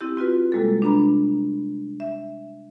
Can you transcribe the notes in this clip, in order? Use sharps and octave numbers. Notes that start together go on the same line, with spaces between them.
C4 E4 G4
C4 F4 F#4 B4
C3 G3 G#3 A#3 A4
D4 B4 A#5 B5
E5